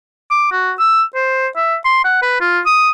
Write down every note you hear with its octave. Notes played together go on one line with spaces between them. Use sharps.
D6
F#4
E6
C5
E5
C6
F#5
B4
F4
D#6